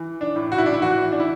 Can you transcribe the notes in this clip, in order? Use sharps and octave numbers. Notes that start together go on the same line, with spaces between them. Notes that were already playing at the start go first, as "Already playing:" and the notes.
Already playing: E3
D4
A2
F#4
E4
D4
E4
E3 F#4
D4
E4